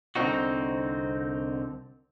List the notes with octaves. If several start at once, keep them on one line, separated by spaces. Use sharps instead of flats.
C2 D3 C4 D#4 F#4